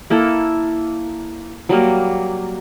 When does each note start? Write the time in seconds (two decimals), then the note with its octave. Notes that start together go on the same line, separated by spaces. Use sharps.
0.10 A#3 E4 A4
1.69 F#3 G3 A#3